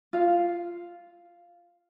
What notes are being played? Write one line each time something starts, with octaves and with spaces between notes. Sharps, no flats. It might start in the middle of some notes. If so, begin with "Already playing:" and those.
F4 F5